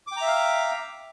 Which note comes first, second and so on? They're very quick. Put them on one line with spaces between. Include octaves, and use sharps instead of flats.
D6 G5 A#5 E5 F5